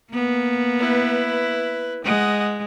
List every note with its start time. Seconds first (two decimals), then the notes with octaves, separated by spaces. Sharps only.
0.13 A#3 B3
0.79 E4 B4
2.04 G#3 D#5 F#5